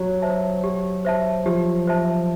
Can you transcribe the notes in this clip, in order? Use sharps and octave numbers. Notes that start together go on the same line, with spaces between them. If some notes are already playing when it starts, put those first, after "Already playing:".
Already playing: F#3 G4
C5 E5 A5
G4
C5 E5 A5
F3 G4
C5 E5 A5